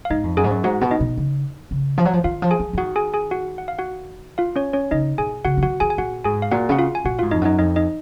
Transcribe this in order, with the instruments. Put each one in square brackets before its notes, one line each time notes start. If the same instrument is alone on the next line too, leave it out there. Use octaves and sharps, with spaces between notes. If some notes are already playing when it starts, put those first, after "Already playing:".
[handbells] F5
[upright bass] G#2 [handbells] D#4 D#5
[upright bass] F2
[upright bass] F#2 [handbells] G#4 G#5
[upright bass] G#2
F#2
[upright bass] G#2 [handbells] F#4 F#5
[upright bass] B2
[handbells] D#4 D#5
[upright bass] B2
C#3
C#3
F3
F#3
F3
[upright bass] D#3 [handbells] F4 F5
[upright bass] F3
[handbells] G#4 G#5
[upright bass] F3
F3
[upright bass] D#3 [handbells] F#4 F#5
[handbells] G#4 G#5
G#4 G#5
F#4 F#5
F#5
F5
F#4 F#5
F4 F5
C#4 C#5
C#4 C#5
[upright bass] C#3 [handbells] D#4 D#5
[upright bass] B2 [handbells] G#4 G#5
[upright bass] C#3 [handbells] F#4 F#5
[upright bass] F3
[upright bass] D#3 [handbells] F#4 F#5
[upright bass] D#3 [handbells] G#4 G#5
[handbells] G#5
[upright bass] A#2 [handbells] F#4 F#5
[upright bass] G#2 [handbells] G#4 G#5
[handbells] F5
[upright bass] A#2 [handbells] F#4 F#5
[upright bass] C#3 [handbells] F#5
[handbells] F4 F5
G#5
[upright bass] A#2 [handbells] F#4 F#5
[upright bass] G#2 [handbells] F4 F5
[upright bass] F2 [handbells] D#4 D#5
[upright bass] F#2 [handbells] D#4 D#5
[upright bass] F2 [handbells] D#4 D#5
[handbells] D#4 D#5